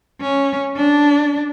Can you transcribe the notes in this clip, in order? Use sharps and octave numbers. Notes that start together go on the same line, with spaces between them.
C#4
D4